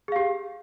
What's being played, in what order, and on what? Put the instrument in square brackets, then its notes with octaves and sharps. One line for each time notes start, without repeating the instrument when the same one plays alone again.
[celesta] G#4
F5
G4